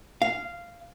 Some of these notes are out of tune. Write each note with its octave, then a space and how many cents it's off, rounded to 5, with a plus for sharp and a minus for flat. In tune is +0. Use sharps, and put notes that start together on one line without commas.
F5 -10